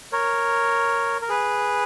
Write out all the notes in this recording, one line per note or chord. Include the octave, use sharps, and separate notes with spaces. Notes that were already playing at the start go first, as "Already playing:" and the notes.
A#4 C#5
A#4
G#4 B4